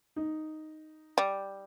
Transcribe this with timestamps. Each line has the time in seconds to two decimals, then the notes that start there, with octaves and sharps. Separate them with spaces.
0.16 D#4
1.18 G3